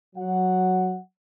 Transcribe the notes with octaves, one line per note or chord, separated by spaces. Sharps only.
F#3 F#5